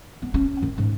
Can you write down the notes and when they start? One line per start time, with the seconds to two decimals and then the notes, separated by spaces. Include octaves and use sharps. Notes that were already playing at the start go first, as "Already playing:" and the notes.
0.22 B3
0.34 C#4
0.62 D#3
0.78 G#2